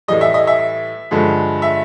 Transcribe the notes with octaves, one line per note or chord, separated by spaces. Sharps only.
A2 E3 G3 D#5
E5
D#5
E5
G2 D3 F3 G#3
E5